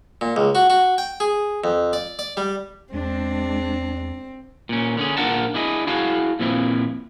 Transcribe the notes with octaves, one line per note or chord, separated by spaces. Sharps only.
A#2
C#2
F#4
F#4
G5
G#4
F2
D5
D5
G3
E2 G#3 C4 D4
A#2 C#4
D3 C#4 G#4
A#2 D4 F4 A#4 F#5 A5
D4 E4 G#4 D#5
E4 F#4 G#4 F5 A5
A#2 F3 C4 E4